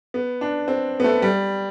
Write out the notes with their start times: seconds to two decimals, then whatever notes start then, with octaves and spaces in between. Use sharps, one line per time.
0.14 B3
0.41 D4
0.68 C4
1.00 B3
1.04 A3
1.22 G3